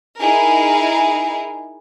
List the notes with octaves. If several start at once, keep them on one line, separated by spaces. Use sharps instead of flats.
D#4 E4 G#4 A#4